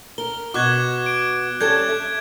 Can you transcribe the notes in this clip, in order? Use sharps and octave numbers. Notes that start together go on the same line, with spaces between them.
A#4 G7
B2 F#4 D6 F#6 G#6
D7
G3 C#4 A4 G6 G#6
E5